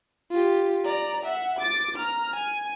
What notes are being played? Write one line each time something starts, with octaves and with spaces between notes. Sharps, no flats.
F4 G4
D5 A#5
E5 F#5
D6 A6
A#5 F6
G#5